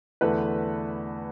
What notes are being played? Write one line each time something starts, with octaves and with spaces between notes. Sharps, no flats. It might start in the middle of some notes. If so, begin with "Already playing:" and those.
E2 D3 A3 E4 A4 B4